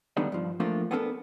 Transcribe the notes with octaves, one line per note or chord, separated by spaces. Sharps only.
D3 D#3 G3 B3 D4 D#4
G2 F3
F3 A3 A#3 C4 D4 F4
B3 C4 D4 G4 A4 A#4